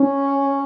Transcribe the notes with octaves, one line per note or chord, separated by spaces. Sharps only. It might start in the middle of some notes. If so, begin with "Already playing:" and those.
Already playing: C#4